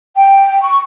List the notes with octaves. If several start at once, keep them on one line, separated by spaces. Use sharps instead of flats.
G5
C#6